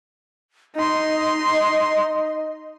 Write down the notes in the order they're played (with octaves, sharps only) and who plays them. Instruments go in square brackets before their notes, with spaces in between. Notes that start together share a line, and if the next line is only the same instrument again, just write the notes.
[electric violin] D#4 C6 [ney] D#5